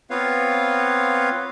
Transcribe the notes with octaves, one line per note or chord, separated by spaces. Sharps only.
B3 C4 F4 B4 C#5 F5